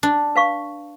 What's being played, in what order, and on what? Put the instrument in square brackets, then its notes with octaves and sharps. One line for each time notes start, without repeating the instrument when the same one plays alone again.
[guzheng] D4
[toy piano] B4 F5 C#6